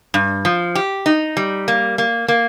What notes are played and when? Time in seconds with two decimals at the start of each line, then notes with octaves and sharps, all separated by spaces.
0.14 G2
0.45 F3
0.75 G4
1.06 D#4
1.37 G3
1.68 A#3
1.98 A#3
2.28 A#3